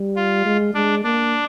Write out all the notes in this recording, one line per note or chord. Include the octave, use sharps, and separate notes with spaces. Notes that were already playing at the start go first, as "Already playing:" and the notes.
Already playing: G3
F4
G#3
G#3 D4
A#3 D4